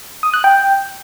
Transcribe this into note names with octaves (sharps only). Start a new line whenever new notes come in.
D#6
F#6
G5